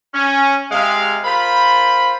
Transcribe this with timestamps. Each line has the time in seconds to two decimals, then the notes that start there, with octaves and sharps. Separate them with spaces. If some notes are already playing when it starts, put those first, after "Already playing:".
0.14 C#4
0.71 C3 G#3 F5
1.25 F4 A#4 C5 B5